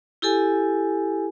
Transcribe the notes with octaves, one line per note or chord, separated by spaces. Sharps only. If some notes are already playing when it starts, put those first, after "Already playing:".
E4 G4 A4 G#5